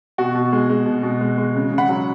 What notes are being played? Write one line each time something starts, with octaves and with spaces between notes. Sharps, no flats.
B2 F#4
B2
G#3
G#3
B2
B2
G#3
G#3
C#3
C#3
F#5 B5
F#3